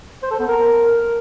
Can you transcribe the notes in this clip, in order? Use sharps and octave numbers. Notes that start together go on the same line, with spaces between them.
C5
A4
B3
A#4